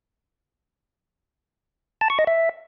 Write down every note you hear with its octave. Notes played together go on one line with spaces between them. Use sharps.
A5
C#6
D#5
E5